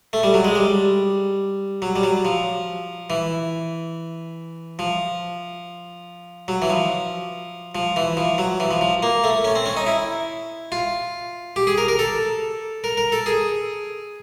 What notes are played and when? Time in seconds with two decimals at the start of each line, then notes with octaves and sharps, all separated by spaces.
0.13 A3
0.23 G3
0.34 F#3
0.45 G#3
0.56 G3
1.82 F#3
1.96 G3
2.03 F#3
2.25 F3
3.10 E3
4.79 F3
6.48 F#3
6.62 E3
6.70 F3
7.75 F3
7.96 E3
8.17 F3
8.38 F#3
8.60 E3
8.71 F3
8.81 F3
9.03 A#3
9.24 A3
9.44 C#4
9.55 C4
9.66 C#4
9.77 D#4
9.87 E4
10.72 F4
11.56 G4
11.67 G#4
11.78 A#4
11.88 A#4
11.99 A4
12.84 A#4
12.97 A#4
13.12 A4
13.26 G#4